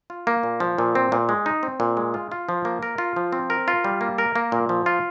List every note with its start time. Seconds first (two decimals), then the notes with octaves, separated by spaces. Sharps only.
0.10 F4
0.27 A#3
0.43 A#2
0.60 F3
0.78 A#2
0.95 C4
1.12 A#2
1.29 G#3
1.46 D#4
1.63 C4
1.80 A#2
1.97 G#3
2.14 F4
2.32 F4
2.49 F3
2.65 A#3
2.82 A#4
2.98 F4
3.16 F3
3.33 C4
3.50 A#4
3.68 F4
3.84 G3
4.01 A#3
4.18 A#4
4.35 A#3
4.52 A#2
4.69 F3
4.86 F4